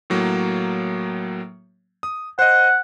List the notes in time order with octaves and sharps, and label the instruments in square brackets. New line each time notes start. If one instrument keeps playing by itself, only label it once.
[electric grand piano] A2 F#3 A#3
D#6
[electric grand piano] C5 D#5 [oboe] F#5